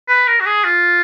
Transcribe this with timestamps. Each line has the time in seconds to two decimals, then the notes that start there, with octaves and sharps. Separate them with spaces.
0.09 B4
0.27 A#4
0.40 F#4
0.46 G#4
0.64 F4